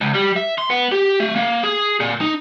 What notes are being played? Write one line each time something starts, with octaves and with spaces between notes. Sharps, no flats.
C#2
G3
E5
C6
B3
G4
A3
A#3
G#4
A#2
D#4